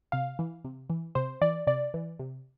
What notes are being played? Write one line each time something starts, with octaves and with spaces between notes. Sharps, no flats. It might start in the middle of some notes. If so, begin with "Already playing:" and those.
C3 F5
E3
C3
E3
C3 C5
E3 D5
C3 D5
E3
C3